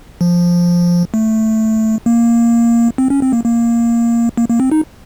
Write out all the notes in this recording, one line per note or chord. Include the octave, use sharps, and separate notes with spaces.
F3
A3
A#3
C4
C#4
C4
A#3
A#3
A#3
A#3
C4
D#4